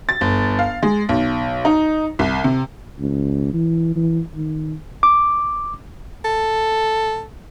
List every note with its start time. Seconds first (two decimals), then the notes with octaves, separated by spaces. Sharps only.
0.09 A6
0.21 G1
0.59 F5
0.83 G#3
1.09 B1
1.65 D#4
2.19 C2
2.44 C3
2.99 C#2
3.53 E3
3.96 E3
4.35 D#3
5.03 D6
6.25 A4